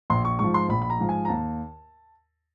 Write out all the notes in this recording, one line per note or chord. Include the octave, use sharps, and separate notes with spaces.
A#1 C6
C#6
G#2 F3 C#6
C6
A#1 B5
B5
A#5
G#2 F3
G#5
A#5
D#2 A5